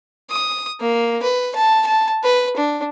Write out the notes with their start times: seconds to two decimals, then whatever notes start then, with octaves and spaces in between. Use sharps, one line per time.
0.30 D#6
0.80 A#3
1.23 B4
1.56 A5
1.86 A5
2.24 B4
2.57 D4